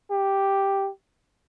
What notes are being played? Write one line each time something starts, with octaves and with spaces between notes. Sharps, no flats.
G4